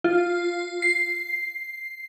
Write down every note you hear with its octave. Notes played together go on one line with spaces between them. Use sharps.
F4
C7